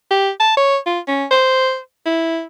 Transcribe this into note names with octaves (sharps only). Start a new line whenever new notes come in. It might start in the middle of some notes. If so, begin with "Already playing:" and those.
G4
A5
C#5
F4
C#4
C5
E4